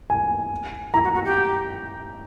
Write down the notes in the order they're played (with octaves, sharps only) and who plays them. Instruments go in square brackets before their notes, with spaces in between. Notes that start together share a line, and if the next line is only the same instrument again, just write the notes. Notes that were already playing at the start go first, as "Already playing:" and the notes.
[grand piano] G#5
[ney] E4 [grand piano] A#5
[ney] F#4
F#4
G4